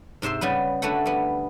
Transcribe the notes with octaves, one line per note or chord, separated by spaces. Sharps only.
G#2 C3 C5 E5 C6
C#3 G3 B3 B4
D3 A3 F#4 B4 F#5
G3 B3